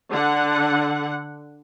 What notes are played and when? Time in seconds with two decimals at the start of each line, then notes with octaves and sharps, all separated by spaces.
0.11 D3 F#5